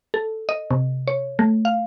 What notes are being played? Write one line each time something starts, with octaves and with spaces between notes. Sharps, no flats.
A4
D#5
C3
C#5
A3
F5